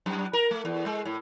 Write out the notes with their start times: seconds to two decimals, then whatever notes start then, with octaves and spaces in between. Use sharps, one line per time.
0.06 F#2
0.33 A#4
0.51 A3
0.65 E2
0.86 G#3
1.05 A2